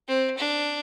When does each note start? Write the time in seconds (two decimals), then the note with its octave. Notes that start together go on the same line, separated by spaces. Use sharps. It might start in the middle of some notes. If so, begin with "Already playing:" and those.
0.08 C4
0.38 D4